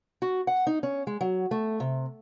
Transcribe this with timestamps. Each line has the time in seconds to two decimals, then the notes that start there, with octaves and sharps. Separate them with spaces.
0.22 F#4
0.47 F#5
0.67 D#4
0.83 C#4
1.07 G#3
1.21 F#3
1.51 A3
1.80 C3